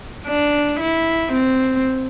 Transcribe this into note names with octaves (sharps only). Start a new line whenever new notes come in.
D4
E4
C4